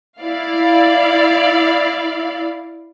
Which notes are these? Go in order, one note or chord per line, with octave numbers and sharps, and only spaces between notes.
E4 D5 F5